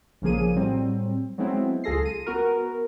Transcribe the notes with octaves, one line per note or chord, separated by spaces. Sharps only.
A#1 C#3 F3 A#3 G#4 D#7
A2 F#3 G3 C4
F#3 G#3 B3 C4 E4
C#2 F4 G#4 A4 A#6 C7
D#7
B3 F#4 A#4